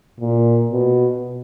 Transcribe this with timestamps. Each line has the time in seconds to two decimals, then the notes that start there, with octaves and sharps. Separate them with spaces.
0.20 A#2
0.71 B2